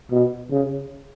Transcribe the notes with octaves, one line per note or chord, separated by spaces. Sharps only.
B2
C#3